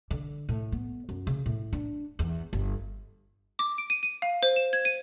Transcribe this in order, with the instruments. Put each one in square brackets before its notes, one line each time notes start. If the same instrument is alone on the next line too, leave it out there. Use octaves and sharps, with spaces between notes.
[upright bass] D3
A2
B3
F#2
C#3
A2
D4
E2
G1
[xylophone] D6
D7
D#7
D#7
F5
C5
E7
G#6
D#7